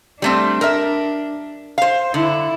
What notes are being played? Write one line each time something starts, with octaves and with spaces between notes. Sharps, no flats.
G3 A3 C4 D4
A#4 E5
C5 F5
D3 E4